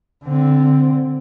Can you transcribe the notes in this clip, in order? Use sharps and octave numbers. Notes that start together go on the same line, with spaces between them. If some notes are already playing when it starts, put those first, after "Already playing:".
D3 C4